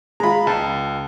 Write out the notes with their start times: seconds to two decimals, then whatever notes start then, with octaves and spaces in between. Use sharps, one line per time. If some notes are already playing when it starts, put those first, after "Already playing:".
0.20 G#3 F4 A#5 B5
0.47 C#2 A5